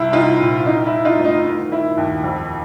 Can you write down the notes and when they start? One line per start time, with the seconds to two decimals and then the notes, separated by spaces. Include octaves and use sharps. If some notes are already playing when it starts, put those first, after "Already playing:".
Already playing: C2 E4
0.12 C2 D#4 F4
0.40 A#2
0.66 E3 D#4
0.86 E4
0.93 E3
1.05 D#4 F4
1.19 D2
1.25 D#4
1.45 D#3
1.72 D#3 E4
1.97 D#2
2.24 F2